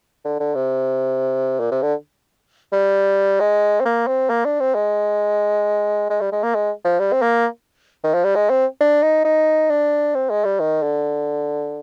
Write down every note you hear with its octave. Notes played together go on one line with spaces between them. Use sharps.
D3
D3
C3
A#2
C3
D3
G3
G#3
C4
A#3
C4
A#3
D4
C4
G#3
G#3
G3
G#3
A#3
G#3
F3
G3
C4
A#3
D#3
F3
G3
G#3
C4
D4
D#4
D#4
D4
C4
G#3
G3
D#3
D3